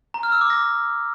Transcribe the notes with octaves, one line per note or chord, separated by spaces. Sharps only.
A#5
F6
E6
D6
A#6